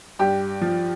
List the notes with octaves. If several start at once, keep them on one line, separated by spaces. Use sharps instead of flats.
G2 G4
F3